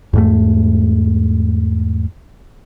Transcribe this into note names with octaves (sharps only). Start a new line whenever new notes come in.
E2 G#2 A3